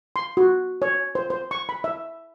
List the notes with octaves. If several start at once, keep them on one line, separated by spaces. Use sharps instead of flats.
C6
F#4
C#5
C5
C5
C#6
B5
E5